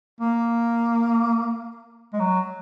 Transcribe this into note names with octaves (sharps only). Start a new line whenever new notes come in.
A#3
G#3
F#3